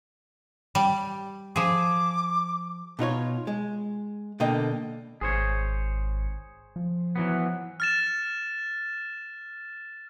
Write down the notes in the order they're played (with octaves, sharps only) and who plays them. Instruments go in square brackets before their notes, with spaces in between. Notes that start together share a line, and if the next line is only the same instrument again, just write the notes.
[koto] G3
[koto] F3 G#4 [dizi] D6
[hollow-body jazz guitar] B2 D#4 F4 C#5
G#3
B2 D3 A#3 D#5 G5
[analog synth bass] G#1 [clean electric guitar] G#4 C5 C#5
[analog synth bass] F3
[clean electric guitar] E3 F#3 B3
[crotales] F6 A6 E7